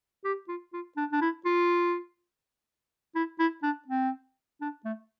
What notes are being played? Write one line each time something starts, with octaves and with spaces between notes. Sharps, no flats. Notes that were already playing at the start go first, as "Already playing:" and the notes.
G4
F4
F4
D4
D4
E4
F4
E4
E4
D4
C4
D4
A3